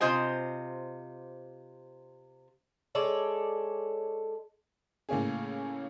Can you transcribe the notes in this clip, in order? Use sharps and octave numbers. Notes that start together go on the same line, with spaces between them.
C3 F4 C5 D#5 G#5
G#3 A4 C#5 D5
A2 C#3 A#3 C#4 G#4